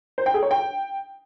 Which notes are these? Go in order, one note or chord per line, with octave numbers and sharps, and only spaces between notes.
C5
G5
G#4
C#5
G5